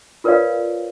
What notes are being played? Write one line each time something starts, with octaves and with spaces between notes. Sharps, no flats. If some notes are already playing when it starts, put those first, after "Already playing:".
F4 A#4 B4 C#5 D5 F5